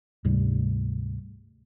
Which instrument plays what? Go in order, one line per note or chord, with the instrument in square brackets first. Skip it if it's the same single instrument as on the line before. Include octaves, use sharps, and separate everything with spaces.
[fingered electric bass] D2 G#2 C3 G3